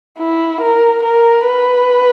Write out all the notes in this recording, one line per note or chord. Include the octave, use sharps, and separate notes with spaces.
E4
A#4
A#4
B4